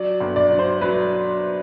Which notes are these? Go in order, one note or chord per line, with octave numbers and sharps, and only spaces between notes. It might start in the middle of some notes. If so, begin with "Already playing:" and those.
Already playing: F#3 D5
G1
D5
F#3
C5
F#3 B4